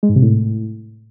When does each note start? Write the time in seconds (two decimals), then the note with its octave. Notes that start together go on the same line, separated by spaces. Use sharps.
0.03 G#3
0.09 G#2
0.16 C3
0.22 A2